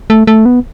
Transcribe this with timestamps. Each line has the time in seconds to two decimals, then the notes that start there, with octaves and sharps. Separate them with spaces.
0.10 A3
0.27 A3
0.45 B3